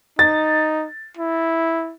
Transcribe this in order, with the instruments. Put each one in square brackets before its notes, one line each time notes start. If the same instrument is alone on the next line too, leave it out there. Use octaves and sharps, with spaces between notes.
[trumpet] D#4 [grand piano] A6
[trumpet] E4